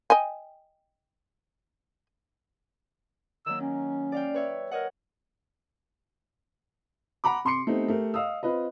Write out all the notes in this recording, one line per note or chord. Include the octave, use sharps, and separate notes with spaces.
D#5 G5 G#5
D#3 F#3 A#3 E6
C#4
D5 F5 G5
B4 C#5 E5
A#4 C#5 D#5 F#5
F#5 A#5 B5 D6
C3 C6 D6 C7 C#7
A3 B3 C4 D#4 G4
A3 G4 A#4
D#5 F5 D#6 E6
C4 F4 B4 D#5